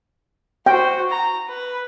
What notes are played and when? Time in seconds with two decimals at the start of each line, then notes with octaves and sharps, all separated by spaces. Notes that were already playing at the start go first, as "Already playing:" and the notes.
0.66 F#4 C5 G5
1.09 A#5
1.48 B4